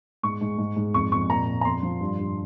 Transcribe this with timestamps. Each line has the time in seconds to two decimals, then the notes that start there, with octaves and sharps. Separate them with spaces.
0.23 G#2 C#6
0.41 G#2
0.58 G#2
0.76 G#2
0.94 F2 C#6
1.12 F2 C#6
1.29 A#2 A#5
1.47 A#2
1.61 A#5
1.65 F2 C6
1.83 F3
2.01 G2
2.19 G2